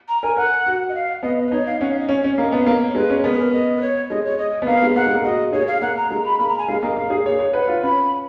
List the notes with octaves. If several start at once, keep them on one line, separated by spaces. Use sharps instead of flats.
A#5
A#4 G#5
A#4 F#5
F#4
D#5
F5
B3 D#5
D#5
B4
D#4 C#5
F5
C#4 F#5
F5
D#5
C#4 C#5
C#4
A#3 D#5
B3
F5
A#3 D#5
C#5
G#3 B4
C#4
B3 A#4
G#4
A#4
D#5
B4
C#5
G#3 D#5
C#5
D#5
B3
A#3 F5
G#3
A#3 F#5
G#3
A#3
F#4 D#5
G#4 C#5
F5
A#3 F#5
A#5
G#3 A#5
B5
A#3 B5
A#5
G#5
G#3 F5
A#3 D#5
A#3 F5
G#4
G#4 C#5
C#5
B4 F#5
F4
C#4 B5